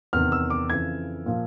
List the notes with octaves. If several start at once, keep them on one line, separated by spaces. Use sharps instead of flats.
E2 C3 D#3 F6
E6
D6
F2 C#3 E3 G#6
A#2 F3